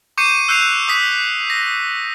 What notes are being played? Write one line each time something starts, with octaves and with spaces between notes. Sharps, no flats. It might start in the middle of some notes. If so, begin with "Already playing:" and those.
C#6 D6 G6 C7 C#7 D#7
E6 F#6 G6 C7 C#7 F7
C#6 D#6 B6
A#6